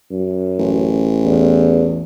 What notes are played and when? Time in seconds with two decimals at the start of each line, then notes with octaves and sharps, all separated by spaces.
0.11 F#2
0.59 A1
1.25 E2